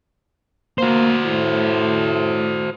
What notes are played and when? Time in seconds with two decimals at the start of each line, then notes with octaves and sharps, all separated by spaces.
0.78 A#3 F#4 C5
1.25 A2